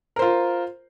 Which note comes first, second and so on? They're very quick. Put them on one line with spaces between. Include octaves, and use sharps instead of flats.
A#4 C5 F4